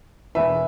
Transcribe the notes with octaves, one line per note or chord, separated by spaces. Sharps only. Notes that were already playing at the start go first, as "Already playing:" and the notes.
E1 E2 E3 B4 E5